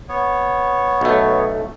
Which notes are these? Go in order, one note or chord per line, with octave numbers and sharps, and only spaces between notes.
B3 C#5
B1 A3